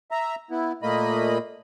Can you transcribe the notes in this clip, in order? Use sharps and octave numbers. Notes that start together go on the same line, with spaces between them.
E5 A#5
B3 E4
A#2 A3 A#3 D#5 B5